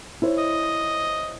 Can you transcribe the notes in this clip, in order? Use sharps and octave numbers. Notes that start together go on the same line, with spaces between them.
E4 C5 C#5
D#5